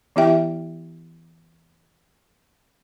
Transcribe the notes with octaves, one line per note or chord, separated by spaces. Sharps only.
E3 B3 E4 G4 E5 G5